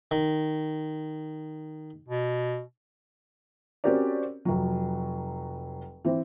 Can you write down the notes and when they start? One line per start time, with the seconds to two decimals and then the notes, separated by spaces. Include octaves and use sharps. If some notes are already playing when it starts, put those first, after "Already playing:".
0.11 D#3
2.08 B2
3.84 C4 C#4 F#4 G4 A#4 D5
4.45 F1 F#3
6.05 E3 C4